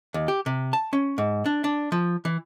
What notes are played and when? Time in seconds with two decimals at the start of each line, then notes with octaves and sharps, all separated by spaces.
0.14 D#2
0.28 G4
0.46 C3
0.73 A5
0.93 C#4
1.18 G#2
1.46 D4
1.64 D4
1.92 F3
2.25 E3